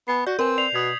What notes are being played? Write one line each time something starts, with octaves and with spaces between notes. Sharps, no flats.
B3 G#5 C7
F#4 D5 G6
C4 A#4 B4 G#5
D5 C7 F7
B2 D#6 G#6 B6